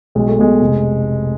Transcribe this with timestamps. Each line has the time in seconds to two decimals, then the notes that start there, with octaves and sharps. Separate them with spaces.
0.15 B1 G#3
0.28 A3
0.39 B2 G#3
0.61 F1